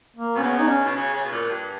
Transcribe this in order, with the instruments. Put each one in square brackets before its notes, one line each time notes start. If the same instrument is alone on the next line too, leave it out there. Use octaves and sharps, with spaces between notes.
[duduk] A#3
[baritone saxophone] B2
[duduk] C#4
[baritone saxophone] C#3 [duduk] B3
[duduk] D#4
C#4
[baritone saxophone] B2
C#3
C#3
B2
A#2
G2